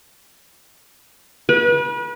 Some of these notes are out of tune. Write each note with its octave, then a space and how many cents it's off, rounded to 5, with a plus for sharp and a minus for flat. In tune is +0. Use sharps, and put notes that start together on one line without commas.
B4 -35